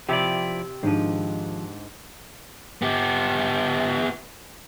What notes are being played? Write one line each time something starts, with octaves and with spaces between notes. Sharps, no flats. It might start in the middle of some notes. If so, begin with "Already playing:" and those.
C3 F3 E4 G4 D5
G#2 D#3 F3 D4
B3 G4